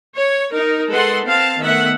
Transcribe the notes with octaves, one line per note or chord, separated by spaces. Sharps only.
C#5
D#4 A#4
G#3 A4 B4 F#5 C6
C4 F5 A5
D#3 A3 B3 E5 F#5